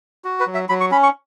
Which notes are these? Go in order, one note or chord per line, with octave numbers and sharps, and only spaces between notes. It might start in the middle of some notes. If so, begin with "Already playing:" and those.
F#4
B4
F#3
E5
F#3 B5
C#6
C#4 B5
C#6